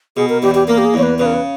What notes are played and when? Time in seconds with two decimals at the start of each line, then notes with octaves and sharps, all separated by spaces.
0.17 B2 G#4
0.29 A#4
0.43 E2 G4
0.55 G4
0.68 A#3 A#4
0.78 G4
0.85 G#4
0.94 E2 C#5
1.03 B4
1.19 C#3 B4
1.26 A#4
1.34 B4